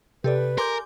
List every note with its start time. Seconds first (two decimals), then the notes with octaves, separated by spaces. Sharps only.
0.24 C3 G4 A4 B4 D5
0.58 A#4 G#5 C6 D6 G6